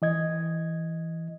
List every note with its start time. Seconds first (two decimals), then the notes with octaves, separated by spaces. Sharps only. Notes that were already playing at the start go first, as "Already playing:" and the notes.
0.02 E3 D#5 G#6